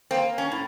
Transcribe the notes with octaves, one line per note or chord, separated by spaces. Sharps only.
A#3 C4
C#4
A2